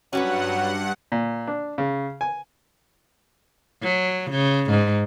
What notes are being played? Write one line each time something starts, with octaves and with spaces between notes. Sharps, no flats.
G2 F#3 C#4 F#4 B4 F#5
A#2
D4
C#3
G#5
F#3
C#3
G#2